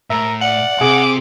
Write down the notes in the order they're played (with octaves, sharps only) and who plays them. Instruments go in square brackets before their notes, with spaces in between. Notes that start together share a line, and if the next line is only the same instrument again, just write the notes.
[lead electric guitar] A2 [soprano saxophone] A#4 [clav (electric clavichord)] E5
[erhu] D5 [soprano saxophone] F#5
[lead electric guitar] C3 [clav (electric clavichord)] G#4 [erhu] D6